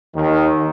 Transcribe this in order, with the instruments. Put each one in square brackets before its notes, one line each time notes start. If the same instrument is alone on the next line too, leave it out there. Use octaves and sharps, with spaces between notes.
[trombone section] D#2 D#3